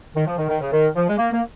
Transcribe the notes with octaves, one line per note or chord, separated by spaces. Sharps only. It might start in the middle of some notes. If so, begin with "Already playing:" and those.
D#3
F3
D#3
D#3
C#3
D#3
F3
G#3
A#3
A#3